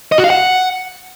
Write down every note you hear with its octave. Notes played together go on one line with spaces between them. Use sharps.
D#5
F#4
F5
F#5